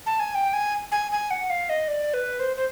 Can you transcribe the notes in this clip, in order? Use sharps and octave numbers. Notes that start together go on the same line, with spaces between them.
A5
G#5
G5
G#5
G#5
G#5
F#5
F5
D#5
D5
B4
C5
C5